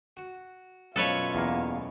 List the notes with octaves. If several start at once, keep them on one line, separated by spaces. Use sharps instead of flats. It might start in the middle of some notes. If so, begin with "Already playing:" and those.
F#4
F#2 B2 F4 A4 B4 C#5 F5
E2 A#3